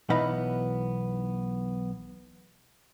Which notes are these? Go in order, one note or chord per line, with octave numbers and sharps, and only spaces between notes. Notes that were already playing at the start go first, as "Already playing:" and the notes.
B1 E3 B3 D#4 F5 B5